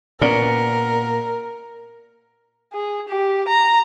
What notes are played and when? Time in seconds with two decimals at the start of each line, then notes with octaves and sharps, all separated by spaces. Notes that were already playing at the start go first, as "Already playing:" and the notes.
0.21 A#2 B3 C#4 A#4 D5
2.73 G#4
3.09 G4
3.48 A#5